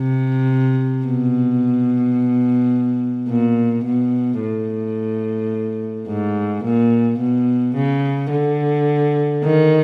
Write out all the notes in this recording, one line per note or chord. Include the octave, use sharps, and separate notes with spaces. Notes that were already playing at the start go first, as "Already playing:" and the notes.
Already playing: C3
B2
A#2
B2
A2
G#2
A#2
B2
C#3
D3
D#3